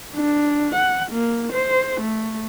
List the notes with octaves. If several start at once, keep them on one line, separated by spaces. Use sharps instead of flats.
D4
F#5
A#3
C5
A3